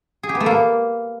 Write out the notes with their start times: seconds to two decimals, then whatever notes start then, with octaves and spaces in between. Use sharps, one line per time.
0.23 G#4
0.29 G4
0.35 B3
0.40 A3
0.46 A#3